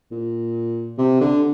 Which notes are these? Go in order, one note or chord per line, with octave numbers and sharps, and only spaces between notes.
A#2
C3
D3